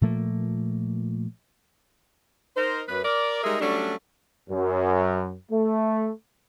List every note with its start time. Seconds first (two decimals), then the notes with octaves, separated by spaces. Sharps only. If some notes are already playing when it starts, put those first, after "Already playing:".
0.01 A#2 F3 A3 A#3
2.57 D#4 A#4 C5
2.89 F#2 B4
3.04 A#4 D5
3.44 G3 G#3 D#4 G#4 A#4 E5
3.61 F#3 G3 A3 C#4 D4
4.50 F#2
5.51 A3